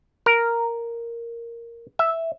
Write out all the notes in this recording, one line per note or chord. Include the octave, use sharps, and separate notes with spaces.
A#4
E5